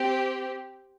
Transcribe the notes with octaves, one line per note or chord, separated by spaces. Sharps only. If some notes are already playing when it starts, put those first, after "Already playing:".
Already playing: C4 G4